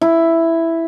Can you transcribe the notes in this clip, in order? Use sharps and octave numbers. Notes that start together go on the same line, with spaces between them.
E4